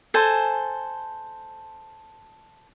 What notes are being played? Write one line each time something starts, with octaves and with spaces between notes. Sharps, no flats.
A4 C5 G#5